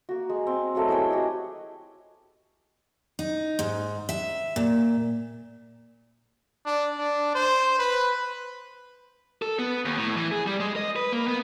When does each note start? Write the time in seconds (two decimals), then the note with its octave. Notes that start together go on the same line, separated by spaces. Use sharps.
0.09 A#3 F#4
0.30 G#3
0.47 C4
0.75 F#3 G#3 A3 A#4
0.88 E4 G#4 C#5 G5
1.10 F#4 G4 D#5
3.19 D#4
3.59 G#2
4.09 E5
4.56 A#2
6.66 D4
6.98 D4
7.35 C5
7.79 B4
9.42 A4
9.59 B3
9.85 D#2
9.97 A2
10.17 E3
10.32 G#4
10.46 G3
10.60 G#3
10.76 D#5
10.96 B4
11.12 A#3
11.28 B3